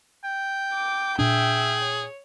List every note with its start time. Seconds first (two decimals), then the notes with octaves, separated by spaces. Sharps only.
0.24 G5
0.73 D6
1.19 A#2 D4 G#4 E5 G5
1.82 C#5